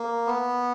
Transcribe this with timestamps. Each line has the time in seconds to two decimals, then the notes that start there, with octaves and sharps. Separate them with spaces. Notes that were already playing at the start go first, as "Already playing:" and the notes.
Already playing: A#3
0.27 B3